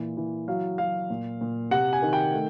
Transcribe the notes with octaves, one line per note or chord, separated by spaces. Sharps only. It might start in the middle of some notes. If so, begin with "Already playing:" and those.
Already playing: A#2 E3
E3
F#3 F5
F#3 F5
A#2
A#2
C3 F#5
G#5
D#3
G5
A3